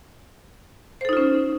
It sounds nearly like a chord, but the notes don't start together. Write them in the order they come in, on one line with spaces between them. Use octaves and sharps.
C5 A4 D#4 F4 C#4